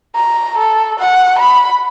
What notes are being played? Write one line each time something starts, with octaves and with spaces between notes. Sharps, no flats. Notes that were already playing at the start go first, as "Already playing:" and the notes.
A#5
A4
F#5
B5